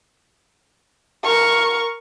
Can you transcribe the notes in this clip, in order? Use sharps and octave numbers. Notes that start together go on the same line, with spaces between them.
A#4 C#6